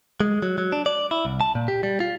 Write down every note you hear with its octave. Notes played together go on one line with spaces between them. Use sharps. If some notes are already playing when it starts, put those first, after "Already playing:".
G#3
F#3
F#3
D4
D5
E4
C2
A5
A#2
G4
G3
F4